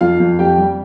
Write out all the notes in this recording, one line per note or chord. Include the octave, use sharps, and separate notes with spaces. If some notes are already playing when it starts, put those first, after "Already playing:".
F2 F4 F5
F2
F2 G4 G5
G3